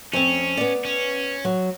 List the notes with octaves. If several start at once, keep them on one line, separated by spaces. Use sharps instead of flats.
F2 C4 C#4
B3 D5
C#4
F#3